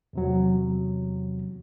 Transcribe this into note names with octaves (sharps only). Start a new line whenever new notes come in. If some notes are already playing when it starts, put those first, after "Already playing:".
E2 C3 F#3